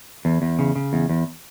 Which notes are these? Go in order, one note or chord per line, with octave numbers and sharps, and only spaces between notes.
E2
E2
C#3
C#3
E2
E2